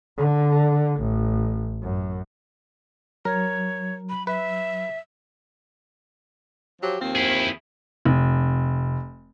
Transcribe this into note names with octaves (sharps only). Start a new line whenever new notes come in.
D3
A1
F#2
F#3 A#4 C#5
B5
B4 E5
F3 F#3 G4
D#2 F3 C4
E4 G#4
F1